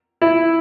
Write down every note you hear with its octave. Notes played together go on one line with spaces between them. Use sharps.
E4